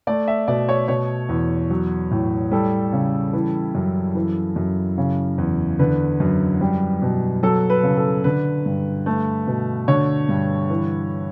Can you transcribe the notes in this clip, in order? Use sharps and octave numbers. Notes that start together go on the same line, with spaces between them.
A3 D5
E5
B2 D5
C#5
B2 C#5
E2
F#3
A2
G3 A4
C#3
E3
F#2
E3
F#2
C#3
E2
D3 B4
F#2
G3
B2
F#3 A4
B4
C#3
A4
D3 B4
G2
A3
B2
D3 C#5
G2
E3